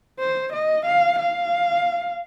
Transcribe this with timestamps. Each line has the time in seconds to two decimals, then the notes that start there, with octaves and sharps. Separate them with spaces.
0.20 C5
0.53 D#5
0.86 F5
1.19 F5